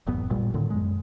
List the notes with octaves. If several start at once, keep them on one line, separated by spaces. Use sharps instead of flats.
E1 A1 F#2 B3
A1 A#2 G3
A2 D3 D#3 A3
F#2 G#3